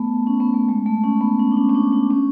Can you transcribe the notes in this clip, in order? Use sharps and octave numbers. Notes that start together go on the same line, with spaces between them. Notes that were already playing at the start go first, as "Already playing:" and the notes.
Already playing: A3 B3
C#4
B3
A3
G#3
A3
C#4
B3
C#4
D4
C#4
C#4
D4
D4
C#4